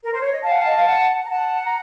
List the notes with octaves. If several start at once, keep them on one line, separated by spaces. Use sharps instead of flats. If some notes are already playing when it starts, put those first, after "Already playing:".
A#4
C5
C#5
D#5
F5 A5
F#5
D#5 A5
F5
F#5
A#5
F#5 A5
A#5